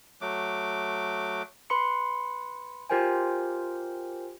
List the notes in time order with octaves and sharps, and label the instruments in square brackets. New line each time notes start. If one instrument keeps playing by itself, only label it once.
[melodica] F#3 A3 D6
[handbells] B4 B5 C6 C#7
F4 G4 A#4 C5 G5 G#5